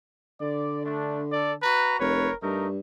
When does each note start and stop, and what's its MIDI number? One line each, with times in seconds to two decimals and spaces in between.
0.41 1.60 50
0.41 0.84 74
0.85 1.22 57
0.85 1.22 62
1.32 1.54 69
1.32 1.54 74
1.63 1.98 66
1.63 1.98 71
1.63 1.98 82
2.00 2.28 29
2.00 2.33 70
2.00 2.33 71
2.00 2.33 73
2.43 2.79 43
2.43 2.68 57
2.43 2.68 63
2.43 2.68 70